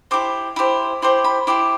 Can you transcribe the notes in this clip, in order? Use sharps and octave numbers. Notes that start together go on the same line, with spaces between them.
E4 G4 C5 D6
E4 G4 C5
E4 G4 C5 C6
B5
E4 G4 C5 D6